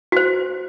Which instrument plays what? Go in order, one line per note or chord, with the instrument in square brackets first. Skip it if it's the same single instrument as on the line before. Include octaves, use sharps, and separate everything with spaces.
[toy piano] F#4 C5